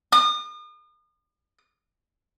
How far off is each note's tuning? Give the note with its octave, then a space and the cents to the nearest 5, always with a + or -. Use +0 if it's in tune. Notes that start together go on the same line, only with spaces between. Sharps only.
D#6 -40